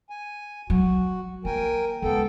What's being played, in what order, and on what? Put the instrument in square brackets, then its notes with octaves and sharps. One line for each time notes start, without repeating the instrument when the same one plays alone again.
[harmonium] G#5
[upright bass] F#3 [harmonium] F#4
[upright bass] A#3 [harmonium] A#4 G5 G#5
[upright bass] C#2 [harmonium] B3 A4 G5